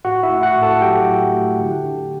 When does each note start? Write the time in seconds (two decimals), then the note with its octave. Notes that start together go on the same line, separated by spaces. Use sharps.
0.04 A2 F#4 F#5
0.23 E4 E5
0.30 A3
0.42 F#4 F#5
0.56 A2
0.62 A4 A5
0.81 F#3 G4 G5
1.07 A2
1.33 A3
1.59 D3
1.84 D4